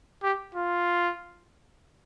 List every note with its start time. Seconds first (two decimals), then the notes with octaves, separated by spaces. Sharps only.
0.23 G4
0.55 F4